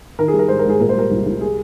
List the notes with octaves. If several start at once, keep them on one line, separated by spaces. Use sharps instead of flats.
D#3 A#4
G#4
G3
A#4
G#2 C5
A#4
G#2 G#4
A#2 A#4
C5
G3 A#4
C2
C2
G3 G#4